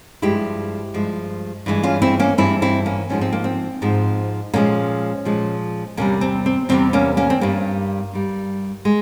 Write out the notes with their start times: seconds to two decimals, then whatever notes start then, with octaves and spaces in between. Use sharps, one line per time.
0.22 G2 F3 G#3 E4 G4
0.94 G2 F3 G#3
1.66 G2 E3 G#3
1.83 C#4 F4
2.02 C4 E4
2.19 A#3 C#4
2.38 G2 E3 G#3 C4 E4
2.62 C4 E4
2.86 A#3 C#4
3.09 G#2 F3 G#3 C#4
3.21 C4
3.33 A#3
3.44 C4
3.82 G#2 F3 G#3
4.54 A#2 F3 G#3 A#3 C#4
5.25 A#2 F3 G#3
5.97 E2 C3 G3 A#3 C#4
6.21 C4
6.46 C4
6.69 E2 C3 G3 C4
6.93 A#3 C#4
7.17 A#3 C#4
7.30 C4
7.41 G2 G3 A#3
8.13 G2 G3
8.85 G#3